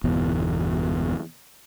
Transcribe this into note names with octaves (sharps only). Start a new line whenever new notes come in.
G1 E2 B2